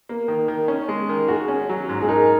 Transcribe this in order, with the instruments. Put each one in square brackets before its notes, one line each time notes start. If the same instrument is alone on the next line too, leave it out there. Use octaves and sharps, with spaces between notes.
[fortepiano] A#3
D#3
D#3
C#4
G#3
D#3
[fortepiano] F#4 [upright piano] G#4
[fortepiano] C#4
F#3
G#2
[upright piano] G#4
[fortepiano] D#4 [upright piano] A#4